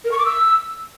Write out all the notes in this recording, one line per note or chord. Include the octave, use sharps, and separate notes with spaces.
A#4
C#6
D6
E6